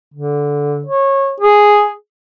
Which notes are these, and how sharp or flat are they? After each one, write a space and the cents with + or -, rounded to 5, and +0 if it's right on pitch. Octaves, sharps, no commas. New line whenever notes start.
D3 -15
C#5 -20
G#4 +0